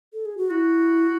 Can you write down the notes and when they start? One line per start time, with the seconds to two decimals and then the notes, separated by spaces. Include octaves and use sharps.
0.13 A4
0.26 G#4
0.37 F#4
0.50 E4 F#4